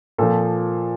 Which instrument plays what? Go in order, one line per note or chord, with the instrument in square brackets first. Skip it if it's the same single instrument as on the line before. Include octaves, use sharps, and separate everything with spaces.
[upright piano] A#2 F3 A4